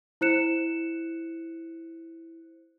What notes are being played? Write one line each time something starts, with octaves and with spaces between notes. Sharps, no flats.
E4 C5 F#6 C#7 E7